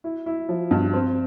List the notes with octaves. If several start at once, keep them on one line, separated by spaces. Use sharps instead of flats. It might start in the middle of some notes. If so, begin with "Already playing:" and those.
E4
E4
F3
G2
C4